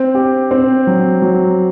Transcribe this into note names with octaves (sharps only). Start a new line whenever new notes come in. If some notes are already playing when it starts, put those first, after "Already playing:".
Already playing: C4
G4
C4
F#3
F#3